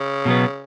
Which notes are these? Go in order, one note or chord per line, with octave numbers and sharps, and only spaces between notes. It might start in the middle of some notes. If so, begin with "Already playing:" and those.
Already playing: C#3
B2 F#3 B3